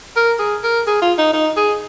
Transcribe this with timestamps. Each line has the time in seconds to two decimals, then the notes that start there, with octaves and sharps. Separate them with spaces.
0.16 A#4
0.39 G#4
0.63 A#4
0.87 G#4
1.02 F4
1.18 D#4
1.33 D#4
1.56 G#4